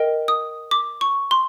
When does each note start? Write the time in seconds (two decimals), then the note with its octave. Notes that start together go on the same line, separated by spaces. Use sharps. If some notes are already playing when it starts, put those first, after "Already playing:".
Already playing: A#4 D#5 G5
0.28 D#6
0.71 D6
1.01 C#6
1.31 C6